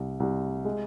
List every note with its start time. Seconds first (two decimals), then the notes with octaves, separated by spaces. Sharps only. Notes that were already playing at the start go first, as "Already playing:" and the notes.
Already playing: C2
0.20 C2
0.65 G#3